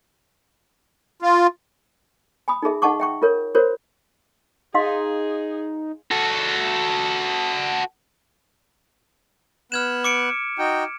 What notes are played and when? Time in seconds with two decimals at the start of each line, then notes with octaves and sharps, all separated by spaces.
1.22 F4
2.48 G#5 B5 D#6
2.62 D#4 F4 G#4 E5
2.82 D#4 D#5 F#5 A5 C#6 D6
3.00 E5 G5 C#6
3.22 F4 A#4 C#5
3.55 F4 F#4 A#4 C5 C#5
4.74 D#4 G#4 D#5 F5 C6
6.11 F#4 A4
9.72 B3 F6 F#6 G#6 E7
10.04 D6 C#7 D7
10.59 D#4 F#4 G5